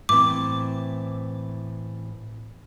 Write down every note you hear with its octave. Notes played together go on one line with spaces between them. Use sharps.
A2 E3 C4 D6